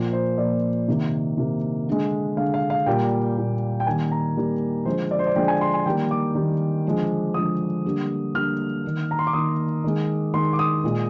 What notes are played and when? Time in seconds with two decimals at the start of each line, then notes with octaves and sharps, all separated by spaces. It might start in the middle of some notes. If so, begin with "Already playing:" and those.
Already playing: A#2 F3 A#3
0.13 C5
0.38 A#2 F3 A#3 D5
0.88 C3 D#3 A#3
1.38 C3 D#3 A#3
1.88 D3 G#3
2.37 D3 G#3 F5
2.54 F5
2.70 F5
2.86 A#2 G3 A#3 G5
3.36 A#2 G3 A#3
3.80 G5
3.87 D#3 G3 A#3 G#5
4.12 A#5
4.37 D#3 G3 A#3
4.85 D3 F3 G#3 C5
5.11 D5
5.19 C5
5.27 D5
5.35 D3 F3 G#3 G5
5.48 G#5
5.61 C6
5.74 G#5
5.86 D#3 G3 A#3 G5
6.11 D6
6.35 D#3 G3 A#3
6.85 D3 F3 G#3
7.34 D3 F3 G#3 D#6
7.85 D3 G3 A#3
8.34 D3 G3 A#3 F6
8.84 D#3 A#3
9.11 A#5
9.19 C6
9.27 D6
9.33 D#3 A#3 D#6
9.84 D#3 G#3
10.34 D#3 G#3 C6
10.53 D6
10.59 D#6
10.84 A#2 G#3